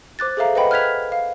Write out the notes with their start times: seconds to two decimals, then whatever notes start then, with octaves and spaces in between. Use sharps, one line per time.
0.19 C5 D6 F#6 A6
0.37 G#4 A4 C5 E5 F5 A#5
0.55 B4 C5 D#5 F#5 G5 B5
0.71 F6 F#6 G#6 B6 F7
1.12 F5